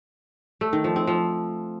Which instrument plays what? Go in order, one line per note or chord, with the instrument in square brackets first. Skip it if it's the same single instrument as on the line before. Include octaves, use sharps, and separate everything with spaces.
[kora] A3
D#3
F3
C4
F3